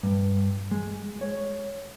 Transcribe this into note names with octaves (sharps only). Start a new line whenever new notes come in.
G2
G#3
C#5